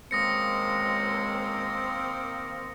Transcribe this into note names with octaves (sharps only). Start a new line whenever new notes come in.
C#2 D#3 G#3 A#3 C4 D#6 A#6 C#7